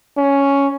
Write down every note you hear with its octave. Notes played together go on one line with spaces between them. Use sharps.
C#4